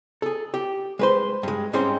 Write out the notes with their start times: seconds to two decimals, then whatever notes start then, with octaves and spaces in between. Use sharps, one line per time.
0.22 G#4 A4
0.54 G4
0.99 G#3 B4 C5
1.43 G2 G#3
1.73 G#2 G3 G#3 C4 C#4 C5